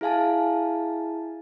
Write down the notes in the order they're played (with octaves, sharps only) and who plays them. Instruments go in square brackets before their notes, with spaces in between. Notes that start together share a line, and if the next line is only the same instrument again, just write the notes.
[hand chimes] E4 G#4 F5 G#5 A5